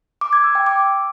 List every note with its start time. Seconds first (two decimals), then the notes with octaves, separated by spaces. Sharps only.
0.21 D6
0.33 G#6
0.44 E6
0.55 G5
0.67 D6